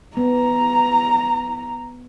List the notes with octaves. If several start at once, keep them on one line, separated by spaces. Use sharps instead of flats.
B3 A#5